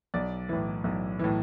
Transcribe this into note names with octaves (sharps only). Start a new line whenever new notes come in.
B1 D5
A2 E3
B1
A2 E3